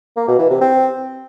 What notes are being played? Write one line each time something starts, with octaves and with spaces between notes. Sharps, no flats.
A#3
B2
E3
C3
C4